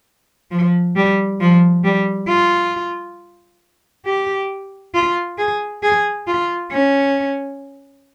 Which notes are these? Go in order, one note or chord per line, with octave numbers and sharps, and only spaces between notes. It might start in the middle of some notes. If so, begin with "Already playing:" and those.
F3
G3
F3
G3
F4
G4
F4
G#4
G#4
F4
C#4